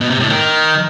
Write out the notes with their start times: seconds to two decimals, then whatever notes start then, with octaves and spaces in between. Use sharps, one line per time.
0.01 B2
0.10 C3
0.20 A2
0.29 D#3